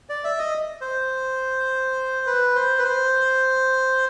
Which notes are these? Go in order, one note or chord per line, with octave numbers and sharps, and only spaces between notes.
D5
E5
D#5
C5
B4
C5
B4
C5